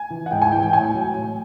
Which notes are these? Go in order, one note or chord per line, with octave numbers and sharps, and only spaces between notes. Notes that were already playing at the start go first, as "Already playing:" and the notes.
Already playing: G#5
E3
F#5
G#2 G5
G#5
E3 G5
G5
A2 G#5
F#3
A2